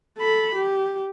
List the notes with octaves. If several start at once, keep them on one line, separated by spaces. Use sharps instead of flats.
A4 B5
G4